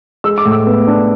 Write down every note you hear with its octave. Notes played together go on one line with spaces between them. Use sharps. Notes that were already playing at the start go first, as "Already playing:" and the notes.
G#3 E6
D6
A2
E6
B3
D4